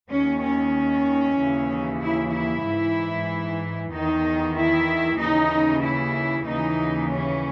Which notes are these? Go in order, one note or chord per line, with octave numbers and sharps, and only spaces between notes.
D#2 D#3 C#4
C#4
D#2 C#3 E3
E4
E4
G#2 E3
E2 D#3 D#4
E4
D#2 C#3 E3 D#4
E4
D#2 C#3 E3 D#4
C#4